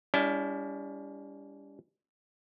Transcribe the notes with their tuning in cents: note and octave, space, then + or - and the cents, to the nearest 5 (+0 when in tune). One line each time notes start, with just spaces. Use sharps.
G3 +30 C#4 +45 E4 +0